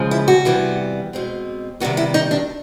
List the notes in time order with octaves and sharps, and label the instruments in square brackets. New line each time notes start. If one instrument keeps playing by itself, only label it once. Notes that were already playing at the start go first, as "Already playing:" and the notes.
Already playing: [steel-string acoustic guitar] C#3 F3 G#3
E4
F#4
C3 E3 G3 B3
B2 G#3 C4
C3 D#3 G3 B3 F#4
E4
D#4
D4